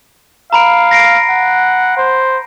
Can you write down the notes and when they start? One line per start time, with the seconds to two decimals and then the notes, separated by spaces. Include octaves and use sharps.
0.53 F5 A#5 B5 D7
0.91 A#6 C7 D7
1.30 F#5
1.97 C5